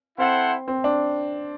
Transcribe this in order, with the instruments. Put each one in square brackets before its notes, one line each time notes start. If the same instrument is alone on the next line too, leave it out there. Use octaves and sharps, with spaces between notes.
[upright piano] C4 [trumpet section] E4 A4 C5 F#5
[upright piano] C4
D4